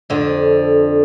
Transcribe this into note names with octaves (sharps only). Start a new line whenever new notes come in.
F2 D3